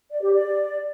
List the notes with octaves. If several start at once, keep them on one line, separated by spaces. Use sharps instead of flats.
D5
G4
D5